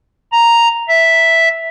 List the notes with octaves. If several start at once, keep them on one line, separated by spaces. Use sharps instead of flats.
A#5
E5